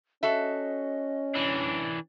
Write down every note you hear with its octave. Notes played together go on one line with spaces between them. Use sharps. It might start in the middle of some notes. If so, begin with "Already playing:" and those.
C#4 F#4 A4 D#5 E5
E3 D4